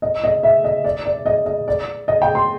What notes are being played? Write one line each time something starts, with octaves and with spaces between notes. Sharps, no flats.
D#5
D#5
E5
D#5
D5
D5
D#5
D#5
D5
D#5
G5
C6